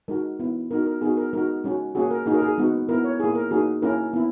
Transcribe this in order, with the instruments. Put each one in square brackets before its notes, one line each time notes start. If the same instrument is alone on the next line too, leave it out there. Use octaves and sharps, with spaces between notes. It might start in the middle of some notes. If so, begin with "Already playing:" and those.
[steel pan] G#3 D#4 F#4 A#4
B3 E4
B3 D#4 F#4 A#4
A#4
B3 D#4 F#4 G#4
A#4
G#3 D#4 F#4 A#4
G#3 C#4 F#4
A#3 C#4 F#4 G#4
A#4
A#3 D#4 F#4 G#4
A#4
G#4
G#3 B3 D#4 F#4
B3 E4 A#4
C#5
A#3 E4 G#4
A#4
A#3 D#4 F#4 G#4
A#3 C#4 E4 A#4
B3 E4